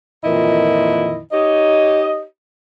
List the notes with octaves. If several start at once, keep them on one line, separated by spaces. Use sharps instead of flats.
F2 A#2 D#3 E3 E4 D#5
D#4 G4 C#5 D#5